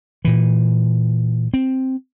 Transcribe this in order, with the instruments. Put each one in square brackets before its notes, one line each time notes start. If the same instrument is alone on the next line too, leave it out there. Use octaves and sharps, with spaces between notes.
[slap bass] A#2 E3
C4